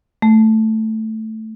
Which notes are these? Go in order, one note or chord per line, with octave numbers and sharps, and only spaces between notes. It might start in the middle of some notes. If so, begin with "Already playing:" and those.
A3